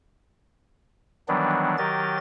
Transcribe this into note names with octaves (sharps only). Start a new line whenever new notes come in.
D#3 E3 F#3 G3 B3 D4
D#3 F#3 G4 A#4 D#5 A6